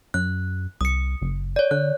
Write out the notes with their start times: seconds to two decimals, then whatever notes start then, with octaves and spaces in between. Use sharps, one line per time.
0.14 F#2 F#6
0.81 C2 D#6 C#7
1.22 F#1
1.56 C#5 D5
1.71 D3 F#6